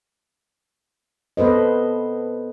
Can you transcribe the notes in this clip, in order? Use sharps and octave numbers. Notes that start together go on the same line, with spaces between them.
B3 A4 B4 C5 D#5